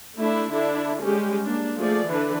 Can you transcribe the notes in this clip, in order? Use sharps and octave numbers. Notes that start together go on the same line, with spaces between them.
A3 D4 E4
D3 D4 E4
G3 G#3 C#4 G4
A#3 D4
F3 A3 G#4 D5
D3 E3 D4 B4